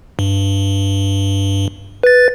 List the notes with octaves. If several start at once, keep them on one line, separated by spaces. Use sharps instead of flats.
G2
B4 A6